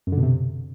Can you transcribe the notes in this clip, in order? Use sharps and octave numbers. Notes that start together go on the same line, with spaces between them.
F#2
D3
B2
C3